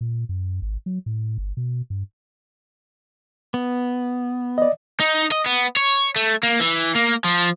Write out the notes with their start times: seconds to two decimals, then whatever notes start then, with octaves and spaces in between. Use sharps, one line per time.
0.01 A#2
0.29 F#2
0.62 G#1
0.86 F#3
1.06 A2
1.38 G1
1.57 B2
1.90 G2
3.54 B3
4.58 D5 D#5
5.00 D#4
5.31 D#5
5.46 B3
5.77 C#5
6.16 A3
6.43 A#3
6.60 E3
6.96 A#3
7.25 F3